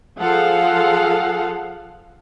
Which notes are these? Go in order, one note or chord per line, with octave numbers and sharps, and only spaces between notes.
F3 G#4 A4 F5 F#5